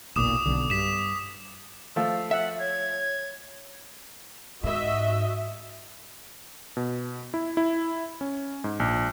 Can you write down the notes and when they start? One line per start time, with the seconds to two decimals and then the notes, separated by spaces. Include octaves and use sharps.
0.16 F#1 B1 A#2 D6 D#6 E7
0.46 B1 D3
0.70 G2 B6 E7
1.96 F3 A3 F5 E6
2.31 E5 F#5
2.59 C#5 G#6
4.64 G#2 F#4 D#5 E5
6.77 B2
7.34 E4
7.57 E4
8.21 C#4
8.64 G#2
8.80 A#1